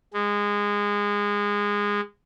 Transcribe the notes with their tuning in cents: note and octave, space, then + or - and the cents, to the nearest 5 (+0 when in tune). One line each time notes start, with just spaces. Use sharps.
G#3 -20